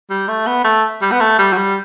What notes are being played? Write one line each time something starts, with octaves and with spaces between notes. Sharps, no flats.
G3
A3
B3
A3
G3
B3
A3
G3
F#3
G3